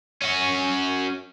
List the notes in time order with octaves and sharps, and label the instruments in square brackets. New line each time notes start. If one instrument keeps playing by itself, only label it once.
[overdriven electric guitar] C#4 F#4